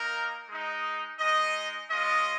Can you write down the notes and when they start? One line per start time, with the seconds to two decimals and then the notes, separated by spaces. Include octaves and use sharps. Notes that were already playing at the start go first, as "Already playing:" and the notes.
Already playing: A#3 D#4 A#4
0.48 G#3 D#4
1.19 G#3 D#4 D#5
1.89 G#3 C#4 F4 D#5